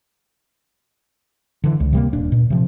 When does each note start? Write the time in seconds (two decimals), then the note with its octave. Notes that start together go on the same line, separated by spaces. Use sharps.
1.64 D3 E3
1.80 C#2
1.93 C3 G3 A#3
2.13 D#1 D4
2.32 A#2
2.50 C3 F3